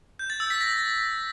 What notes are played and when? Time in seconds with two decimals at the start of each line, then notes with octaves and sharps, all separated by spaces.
0.19 G6
0.30 A6
0.40 E6
0.50 B6
0.61 A#6